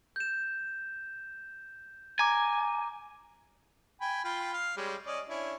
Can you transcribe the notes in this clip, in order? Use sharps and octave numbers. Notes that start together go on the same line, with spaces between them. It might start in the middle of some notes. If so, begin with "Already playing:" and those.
G6 E7
G#5 A#5 D6
G5 G#5 B5
F4 G5 B5
F5
G3 G#3 C#4
C#4 D5 D#5
C#4 D4 E4